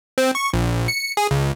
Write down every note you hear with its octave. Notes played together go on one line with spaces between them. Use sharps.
C4
C#6
A#1
C#7
G#4
C#2